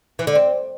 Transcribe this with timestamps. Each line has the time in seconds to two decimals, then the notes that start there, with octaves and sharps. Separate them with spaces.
0.19 E3
0.27 D3
0.35 C4